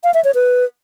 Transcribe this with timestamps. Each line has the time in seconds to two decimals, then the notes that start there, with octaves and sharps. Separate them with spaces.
0.04 F5
0.14 E5
0.24 C#5
0.35 B4